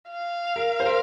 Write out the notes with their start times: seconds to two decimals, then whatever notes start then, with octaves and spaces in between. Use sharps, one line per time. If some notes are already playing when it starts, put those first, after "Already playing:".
0.10 F5
0.56 A#4
0.80 C5
0.86 A#4